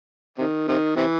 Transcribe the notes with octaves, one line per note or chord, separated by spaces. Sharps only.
C3 D#3
C3 D#3
C3 E3